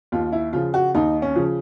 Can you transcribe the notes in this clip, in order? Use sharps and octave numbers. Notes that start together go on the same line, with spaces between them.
D#2 F4
E4
C#3 F3 F4
F#4
D#2 D#4
C#4
C#3 F3